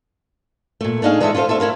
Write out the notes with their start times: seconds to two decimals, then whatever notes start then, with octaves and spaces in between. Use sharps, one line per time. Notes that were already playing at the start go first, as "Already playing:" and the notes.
0.81 A#2 A3
1.02 A3 D4 D#4 G#4 F5
1.20 E3 G#3 F4 A4 D#5 E5
1.35 F4 A4 A#4 C5 F5
1.48 A3 A4 C5 E5
1.60 A3 E4 A#4 F5